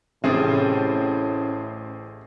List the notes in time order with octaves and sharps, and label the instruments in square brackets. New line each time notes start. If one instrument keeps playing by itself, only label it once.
[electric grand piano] A1 G#4 C5 [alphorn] A2 [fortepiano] C3 [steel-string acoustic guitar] C#4 D5